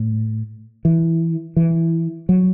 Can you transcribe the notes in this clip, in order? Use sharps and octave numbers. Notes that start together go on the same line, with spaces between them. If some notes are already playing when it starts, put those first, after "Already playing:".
Already playing: A2
E3
E3
F#3